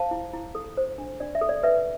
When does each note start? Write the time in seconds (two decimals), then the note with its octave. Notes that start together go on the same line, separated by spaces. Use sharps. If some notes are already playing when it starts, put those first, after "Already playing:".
Already playing: C5 F5 A5
0.11 E4
0.33 E4
0.55 A4
0.77 C5
0.98 D4
1.20 D4 D5
1.35 E5
1.41 A4
1.49 D5
1.63 B4 E5